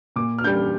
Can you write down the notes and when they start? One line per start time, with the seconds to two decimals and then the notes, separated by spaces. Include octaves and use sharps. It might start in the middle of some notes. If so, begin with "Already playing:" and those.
0.16 A#2 D6
0.38 F6
0.44 G3 D4 G6